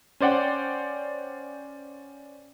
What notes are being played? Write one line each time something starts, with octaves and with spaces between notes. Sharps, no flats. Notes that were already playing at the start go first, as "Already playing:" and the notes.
C#4 C5 D5 F#5 G5